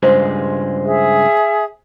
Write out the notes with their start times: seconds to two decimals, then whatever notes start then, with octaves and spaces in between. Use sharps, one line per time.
0.03 C#2 G2 G#3 C5
0.85 G#4 E5